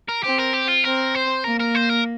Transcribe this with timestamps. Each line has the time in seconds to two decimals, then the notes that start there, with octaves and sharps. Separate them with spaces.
0.09 A#4
0.24 C4 G4
0.39 A#4
0.54 G4
0.68 F4
0.84 C4 A#4
1.15 C5
1.44 A#3 A#4
1.60 A#4
1.75 C5
1.89 A#4